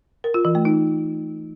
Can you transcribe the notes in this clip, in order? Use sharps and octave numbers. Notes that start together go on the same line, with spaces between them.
A#4
F4
E3
A3
D#4